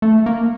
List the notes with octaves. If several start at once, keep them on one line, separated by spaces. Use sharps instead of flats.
A3
A#3